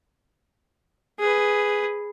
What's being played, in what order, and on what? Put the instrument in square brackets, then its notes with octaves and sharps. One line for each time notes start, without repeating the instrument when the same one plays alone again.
[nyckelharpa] G#4 B4